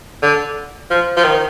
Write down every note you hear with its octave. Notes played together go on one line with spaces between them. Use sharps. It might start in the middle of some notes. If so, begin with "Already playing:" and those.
D3
F3
F3
D#3